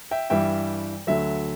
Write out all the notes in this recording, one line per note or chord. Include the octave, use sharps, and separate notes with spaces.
E5 G5
G2 E3 G3 E5 G5
D2 D3 F#3 E5